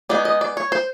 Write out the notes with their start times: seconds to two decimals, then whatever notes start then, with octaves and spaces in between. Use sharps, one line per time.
0.09 G#3 B3 D#4 D5
0.25 D#5
0.41 D5
0.57 C#5
0.72 C5